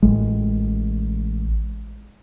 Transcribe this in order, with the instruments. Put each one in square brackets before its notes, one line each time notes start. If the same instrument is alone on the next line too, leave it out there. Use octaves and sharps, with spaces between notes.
[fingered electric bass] A1 G#3